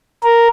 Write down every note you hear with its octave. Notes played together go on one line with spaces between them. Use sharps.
A#4